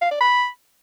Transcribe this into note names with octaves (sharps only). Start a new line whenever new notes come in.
F5
D5
B5